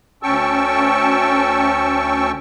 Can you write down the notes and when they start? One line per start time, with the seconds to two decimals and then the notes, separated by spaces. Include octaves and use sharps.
0.23 D2 C#4 G5 A5 C#6 E6